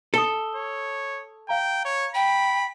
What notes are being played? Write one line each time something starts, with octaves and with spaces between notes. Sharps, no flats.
A4 D#6 G7
C#5
F5 G5 A#5
C#5
G5 B5